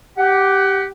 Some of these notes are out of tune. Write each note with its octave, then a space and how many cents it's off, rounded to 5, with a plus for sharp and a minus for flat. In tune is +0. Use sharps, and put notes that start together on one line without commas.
G4 -5 F#5 +20